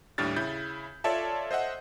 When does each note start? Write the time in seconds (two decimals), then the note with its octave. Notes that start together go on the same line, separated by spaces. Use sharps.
0.18 D#2 A2 G3 D4 F6 A6
0.36 C#3 E4 G6
1.04 F4 A4 C#5 D5 E5 A5
1.51 C5 D#5 E5 F#5